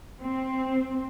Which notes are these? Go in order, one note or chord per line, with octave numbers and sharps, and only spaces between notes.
C4